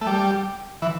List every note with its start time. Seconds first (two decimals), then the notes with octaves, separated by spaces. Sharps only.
0.01 A3
0.07 G3
0.82 E3